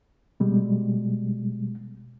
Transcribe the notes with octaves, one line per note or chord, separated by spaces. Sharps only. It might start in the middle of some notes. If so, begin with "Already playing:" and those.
B2 G3 G#3